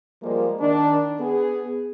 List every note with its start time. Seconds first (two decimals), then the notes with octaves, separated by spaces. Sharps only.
0.23 F3 G3 G#3 A#3
0.60 D#3 D4
1.20 B3 G#4